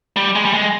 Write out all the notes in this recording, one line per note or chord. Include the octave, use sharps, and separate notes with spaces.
G3
G#3
G3
G#3